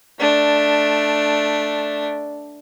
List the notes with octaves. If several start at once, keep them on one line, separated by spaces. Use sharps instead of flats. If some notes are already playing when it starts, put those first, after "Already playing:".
A3 D4